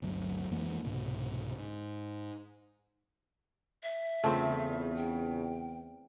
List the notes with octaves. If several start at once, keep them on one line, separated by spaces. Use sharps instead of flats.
G1 D2 F#3
F2 E3 G#3 A#3
C2 G#2 B2 D3
G#2
E5
E2 C#3 A3 C4 F4 A5
G5